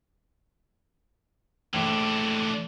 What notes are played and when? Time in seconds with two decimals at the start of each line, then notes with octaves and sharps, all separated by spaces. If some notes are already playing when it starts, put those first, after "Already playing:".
1.74 A#1 E3 A3 D4